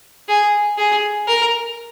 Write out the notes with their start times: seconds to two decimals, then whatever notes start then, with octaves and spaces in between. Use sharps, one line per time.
0.28 G#4
0.78 G#4
1.28 A#4